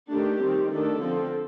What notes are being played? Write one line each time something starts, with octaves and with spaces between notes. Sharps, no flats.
D#3 A3 D4 G4
D#3 G3 C4
D#3 A3 D4 A4
D3 F3 C4